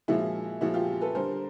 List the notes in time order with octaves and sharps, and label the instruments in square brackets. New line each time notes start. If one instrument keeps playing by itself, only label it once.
[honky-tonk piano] A#2 F3 G#3 E4 F#4
A#2 F3 G#3 E4 F#4
F4 G4
A4 B4
D3 G3 A#4 C5